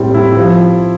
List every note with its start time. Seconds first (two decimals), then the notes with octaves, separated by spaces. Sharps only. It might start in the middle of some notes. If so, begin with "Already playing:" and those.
Already playing: A2 G3 C4 E4
0.14 E4
0.37 F3